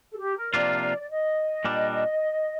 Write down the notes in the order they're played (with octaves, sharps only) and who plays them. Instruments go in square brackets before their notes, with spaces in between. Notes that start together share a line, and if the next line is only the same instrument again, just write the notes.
[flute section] A4
G4
A#4
[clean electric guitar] C3 F3 A#3 D4 F4 [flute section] D5
[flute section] D5
D5
D#5
[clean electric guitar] A#2 G3 D4